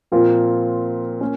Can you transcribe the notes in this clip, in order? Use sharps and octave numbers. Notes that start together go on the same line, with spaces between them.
A#2 F3 C4 F4 A#4
A#3 C#4